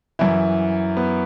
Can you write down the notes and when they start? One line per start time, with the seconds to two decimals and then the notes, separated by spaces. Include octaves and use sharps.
0.19 F#2 E3 E4
0.97 B3